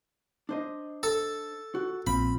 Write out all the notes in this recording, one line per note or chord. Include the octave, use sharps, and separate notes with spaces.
D4 C5 D#5
A4
F#4
A#1 C4 F4 B5